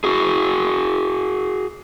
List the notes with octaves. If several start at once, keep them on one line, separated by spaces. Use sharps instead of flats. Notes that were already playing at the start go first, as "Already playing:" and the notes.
F#4 G#4